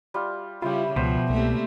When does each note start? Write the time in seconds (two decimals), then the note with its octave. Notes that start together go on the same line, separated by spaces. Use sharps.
0.14 G3 F4
0.62 C#3 G3 E4 F4 G4
0.96 C#2 B2 F3 C5
1.30 C2 C3 A3 A#3